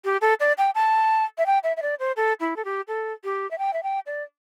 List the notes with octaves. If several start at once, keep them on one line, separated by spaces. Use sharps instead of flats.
G4
A4
D5
G5
A5
E5
G5
E5
E5
D5
C5
A4
E4
A4
G4
A4
G4
E5
G5
E5
G5
D5